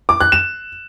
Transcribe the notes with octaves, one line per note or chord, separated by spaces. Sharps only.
D6
F#6
E7